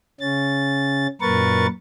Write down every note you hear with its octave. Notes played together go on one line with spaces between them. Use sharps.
C#3 C#4 A6
F#2 A#2 A#4 B4 C#6 A6